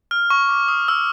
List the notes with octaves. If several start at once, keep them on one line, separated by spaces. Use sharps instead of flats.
F6
C#6
D6
D#6
E6